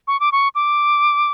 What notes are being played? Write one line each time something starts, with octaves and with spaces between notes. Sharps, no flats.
C#6
D6
C#6
D6